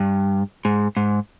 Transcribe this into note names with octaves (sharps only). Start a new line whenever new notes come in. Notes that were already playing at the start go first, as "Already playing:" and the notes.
Already playing: G2
G#2
G#2